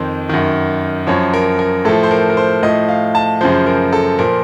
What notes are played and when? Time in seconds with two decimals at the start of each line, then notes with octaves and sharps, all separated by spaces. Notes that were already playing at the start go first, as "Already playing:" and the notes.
Already playing: F2 D#3 C5
0.29 F#2 D#3
1.07 F#2 F3 C#5
1.34 A#4
1.59 A#4
1.85 A2 F3 A4
2.03 C5
2.11 A#4
2.30 A#4
2.37 C5
2.63 A2 F3 D#5
2.89 F5
3.15 A5
3.41 F#2 C#3 F3 C5
3.66 A#4
3.93 A4
4.19 A#2 F3 A#4